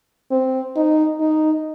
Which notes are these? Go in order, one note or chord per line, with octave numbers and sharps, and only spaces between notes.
C4
D#4
D#4